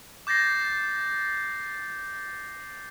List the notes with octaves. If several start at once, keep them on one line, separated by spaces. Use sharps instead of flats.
D6 G6 A6 A#6 C7